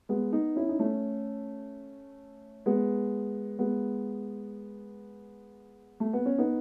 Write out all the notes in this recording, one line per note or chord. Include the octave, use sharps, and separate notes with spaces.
G#3 B3
B3 D#4
C#4 E4
D#4
A3 C#4
G#3 B3
G#3 B3
A3
B3
C#4
B3 D#4